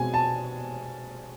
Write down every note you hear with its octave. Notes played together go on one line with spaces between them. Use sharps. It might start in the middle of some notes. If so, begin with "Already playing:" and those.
Already playing: B2 G#3 C4 G#5
A5